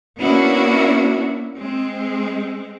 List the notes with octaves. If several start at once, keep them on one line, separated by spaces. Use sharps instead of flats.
A#3 B3 C#4 D4 E4 F#4
G#3 C4